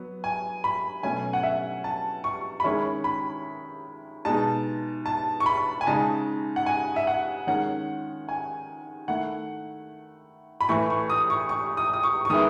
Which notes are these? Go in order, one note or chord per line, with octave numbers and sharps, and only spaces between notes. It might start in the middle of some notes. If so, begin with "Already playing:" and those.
Already playing: F#3 B3
G#5
B5
B2 F#3 A3 C#4 G#5
F#5
E5
A5
C#6
B5
D#3 G#3 C#4 E4 C#6
B5
B2 G#3 D#4 A5
A5
C#6
B5
G#5
C#3 G#3 D#4 A5
F#5
G#5
E5
F#5
D#3 G#3 C#4 F#5
G#5
D#3 A3 E4 F#5
B5
A2 E3 A3 E4 C#6
C#6
D#6
C#6
C#6
D#6
D#6
C#6
C#6
D#3 G#3 B3 E4 D#6